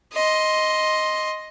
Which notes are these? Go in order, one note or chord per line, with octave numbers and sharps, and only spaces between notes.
D#5 C6